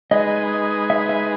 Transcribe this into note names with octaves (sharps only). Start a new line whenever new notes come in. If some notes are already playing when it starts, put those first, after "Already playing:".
G#3 D#4 G#4 B4 D#5
E5
E5